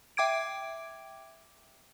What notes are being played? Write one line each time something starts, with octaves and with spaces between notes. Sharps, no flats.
E5 G5 D6 G#6 D7